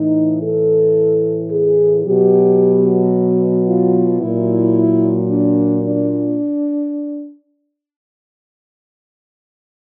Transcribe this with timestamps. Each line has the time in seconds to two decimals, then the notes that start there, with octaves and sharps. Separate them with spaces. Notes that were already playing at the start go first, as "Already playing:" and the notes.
Already playing: A2 E3 D#4
0.43 A4
1.51 G#4
2.05 B2 F#3 G4
3.68 F4
4.21 A#2 F#3 E4
5.29 D4
5.84 D4